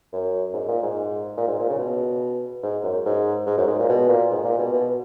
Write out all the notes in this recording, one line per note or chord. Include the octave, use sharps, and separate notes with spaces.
F#2
G#2
A#2
G#2
A#2
G#2
A#2
C#3
B2
G#2
F#2
G#2
G#2
F#2
G#2
A#2
B2
A#2
G#2
A#2
B2
B2